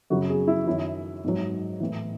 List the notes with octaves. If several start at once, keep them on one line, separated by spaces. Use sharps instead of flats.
F#2 C#3 F#3 F#4
G#4
E4
F#2 D#3 F#3 E4
G#2 F#3
A2 E3